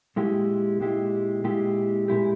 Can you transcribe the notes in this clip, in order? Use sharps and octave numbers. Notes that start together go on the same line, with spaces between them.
A#2 G#3 E4 G4
A#2 G#3 E4 G4
A#2 G#3 E4 G4
A#2 G#3 E4 G4